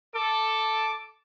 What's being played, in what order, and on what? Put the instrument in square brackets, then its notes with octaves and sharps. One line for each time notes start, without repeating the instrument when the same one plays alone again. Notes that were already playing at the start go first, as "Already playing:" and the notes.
[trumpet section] A4 [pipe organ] D6